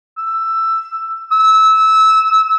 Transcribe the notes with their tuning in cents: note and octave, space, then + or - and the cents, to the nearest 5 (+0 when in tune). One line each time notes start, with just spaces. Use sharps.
E6 +10
E6 -20